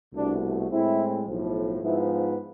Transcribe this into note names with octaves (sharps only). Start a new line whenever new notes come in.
C2 B2 A3 D4
A2 G#3 C4 E4
B1 A2 F3
G#2 F3 B3 E4